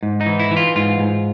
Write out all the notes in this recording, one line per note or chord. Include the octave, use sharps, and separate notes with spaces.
G#2
D#4
E3
E4
E3
F4
G#2 F4
G#2